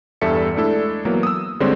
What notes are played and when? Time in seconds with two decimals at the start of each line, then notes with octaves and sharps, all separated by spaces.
0.21 E2 G2 G3 A4 E5 C#7
0.55 G#3 A3 D4 E4 A4
1.05 E3 F#3 A#3 B3
1.23 D#6 E6
1.60 D3 G3 G#3 C4 C5 C#5